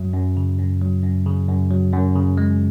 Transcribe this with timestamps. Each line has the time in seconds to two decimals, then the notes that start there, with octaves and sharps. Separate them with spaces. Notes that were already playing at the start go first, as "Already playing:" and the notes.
Already playing: F#2 F#3
0.14 F#2
0.37 C#3
0.58 F#2
0.81 F#3
1.03 F#2
1.26 C#3
1.48 F#2
1.70 F#3
1.93 F#2
2.16 C#3
2.37 G#3